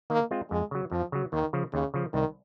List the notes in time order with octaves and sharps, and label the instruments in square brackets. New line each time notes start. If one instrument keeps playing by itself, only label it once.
[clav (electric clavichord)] D#3 [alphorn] A#3
[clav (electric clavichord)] G#3 C4 F4
[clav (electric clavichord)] F2 [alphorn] G#3
[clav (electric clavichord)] C#3 F#3
[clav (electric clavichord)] F2 [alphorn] F3
[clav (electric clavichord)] C#3 F#3
[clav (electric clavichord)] D#2 [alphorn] D#3
[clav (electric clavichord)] C#3 F3
[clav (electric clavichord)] D#2 [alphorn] C#3
[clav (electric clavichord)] C#3 F3
[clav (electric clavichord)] C2 [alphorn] D#3